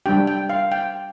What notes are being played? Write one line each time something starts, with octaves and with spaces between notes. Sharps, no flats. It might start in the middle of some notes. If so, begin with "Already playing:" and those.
G3 D4 G4 G5
G5
F5
G5